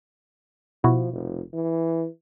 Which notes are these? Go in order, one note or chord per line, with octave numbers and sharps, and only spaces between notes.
B2 F3 E4 F#4
F1
E3